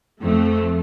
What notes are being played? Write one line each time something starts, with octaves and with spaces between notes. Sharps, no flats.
F2 A3